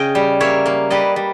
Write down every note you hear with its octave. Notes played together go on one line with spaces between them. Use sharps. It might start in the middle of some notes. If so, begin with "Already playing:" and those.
Already playing: C#3 D#5 G5
G3
A#3 C#5 E5
A#3
G3 B4 D#5
G3